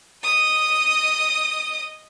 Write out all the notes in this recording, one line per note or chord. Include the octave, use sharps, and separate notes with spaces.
D#5 D#6